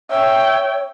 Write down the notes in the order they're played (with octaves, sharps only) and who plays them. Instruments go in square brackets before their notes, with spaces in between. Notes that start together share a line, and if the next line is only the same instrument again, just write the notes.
[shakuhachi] C#5 [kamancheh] E5 G5